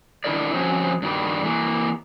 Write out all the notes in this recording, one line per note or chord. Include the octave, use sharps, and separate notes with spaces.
D#3 D4 E4 A#4 D5
F3 F#3 C4 C#4 C#5
G2 D#3 G3
E3 A#3